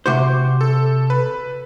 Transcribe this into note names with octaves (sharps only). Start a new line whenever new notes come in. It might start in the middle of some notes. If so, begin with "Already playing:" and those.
C3 F#4 C5 C6 D6 G6
A4
B4